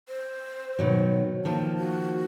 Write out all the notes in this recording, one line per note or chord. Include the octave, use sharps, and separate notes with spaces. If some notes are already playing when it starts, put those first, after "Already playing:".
C5
B2 D#3 F#3
D#3 F3 A#3 A5
F#4